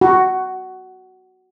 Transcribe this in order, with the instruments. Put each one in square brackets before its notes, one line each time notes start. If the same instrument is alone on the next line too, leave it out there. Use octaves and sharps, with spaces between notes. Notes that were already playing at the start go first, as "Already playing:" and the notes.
[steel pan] F#4